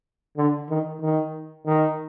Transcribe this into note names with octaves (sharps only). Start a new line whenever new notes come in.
D3
D#3
D#3
D#3